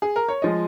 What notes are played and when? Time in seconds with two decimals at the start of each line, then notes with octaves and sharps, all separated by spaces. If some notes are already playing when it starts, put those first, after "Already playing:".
0.02 G#4
0.16 A#4
0.28 C#5
0.42 F3 G#3 D#5